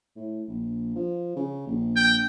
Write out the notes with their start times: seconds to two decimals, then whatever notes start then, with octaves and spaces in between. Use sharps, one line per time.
0.16 A2
0.48 A#1
0.96 F3
1.36 C#3
1.67 A#1
1.96 G5